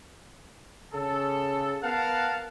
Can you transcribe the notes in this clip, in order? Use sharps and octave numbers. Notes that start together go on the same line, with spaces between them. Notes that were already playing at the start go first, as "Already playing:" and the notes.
C#3 A4
B3 A#4 F5 F#5 A5